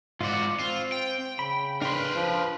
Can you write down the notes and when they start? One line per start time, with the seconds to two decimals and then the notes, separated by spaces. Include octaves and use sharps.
0.21 G#2 F4 F#4 D5
0.59 C4 F4
0.92 G5
1.39 C#3 B5
1.82 D4 A#4 B4 G5 C6
2.15 F3